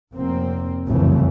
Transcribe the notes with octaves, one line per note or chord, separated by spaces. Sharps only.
F1 A#3 C4
F1 C2 F#2 C#3 E3 A3